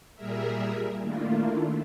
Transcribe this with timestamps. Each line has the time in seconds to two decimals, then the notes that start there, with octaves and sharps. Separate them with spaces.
0.15 A#2 G3 G#4 A#4 E5
1.01 D#3 A3 A#3 D4 E4 F4